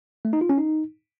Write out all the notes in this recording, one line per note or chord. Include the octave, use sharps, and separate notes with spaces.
A3
D#4
F4
C#4
D#4